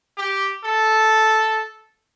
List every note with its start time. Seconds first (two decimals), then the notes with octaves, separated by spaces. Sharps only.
0.18 G4
0.64 A4